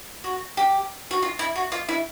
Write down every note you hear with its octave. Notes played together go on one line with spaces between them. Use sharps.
F#4
G4
F#4
F4
E4
F#4
F4
E4